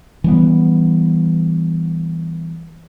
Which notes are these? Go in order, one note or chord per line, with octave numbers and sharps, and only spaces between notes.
E3 G3 B3